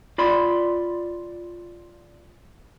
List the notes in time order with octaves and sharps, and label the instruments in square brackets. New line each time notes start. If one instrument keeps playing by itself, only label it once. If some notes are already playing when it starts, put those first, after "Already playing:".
[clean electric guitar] F4 D5 B5 C6